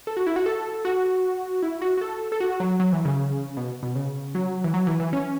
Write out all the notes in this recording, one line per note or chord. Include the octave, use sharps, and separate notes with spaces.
A4
F#4
E4
F#4
A4
F#4
E4
F#4
F#4
A4
A4
F#4
F#3
F#3
E3
C#3
B2
B2
C#3
F#3
E3
F#3
E3
E3
C#4